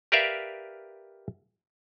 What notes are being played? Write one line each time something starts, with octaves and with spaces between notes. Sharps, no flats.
G4 A#4 B4 D5 E5 F5